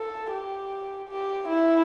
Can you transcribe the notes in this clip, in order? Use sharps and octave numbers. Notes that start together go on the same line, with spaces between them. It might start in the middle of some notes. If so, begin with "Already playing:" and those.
Already playing: A4
G4
G4
E4